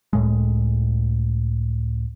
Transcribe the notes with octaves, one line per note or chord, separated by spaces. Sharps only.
C#2 A2 G#3